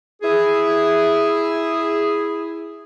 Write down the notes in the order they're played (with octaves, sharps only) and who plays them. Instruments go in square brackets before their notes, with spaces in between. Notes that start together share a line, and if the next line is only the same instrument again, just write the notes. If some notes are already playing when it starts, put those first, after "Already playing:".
[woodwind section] E4 G#4